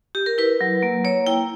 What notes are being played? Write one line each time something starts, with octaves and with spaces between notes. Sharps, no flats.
G4
A#4
E4 B4
F#3
A#3
A#3 C#5
E4 G5